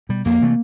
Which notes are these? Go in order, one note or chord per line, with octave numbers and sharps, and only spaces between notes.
B2 G3
F2 A#3
C3 E3 A3